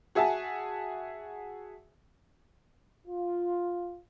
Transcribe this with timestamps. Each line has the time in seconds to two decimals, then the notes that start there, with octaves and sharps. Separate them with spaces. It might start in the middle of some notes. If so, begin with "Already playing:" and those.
0.15 F#4 G#4 E5 G#5 A5
3.07 F4